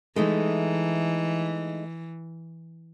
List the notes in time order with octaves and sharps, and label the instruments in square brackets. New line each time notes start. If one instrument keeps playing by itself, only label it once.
[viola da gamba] E3 [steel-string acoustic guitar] G#3 A3 D#4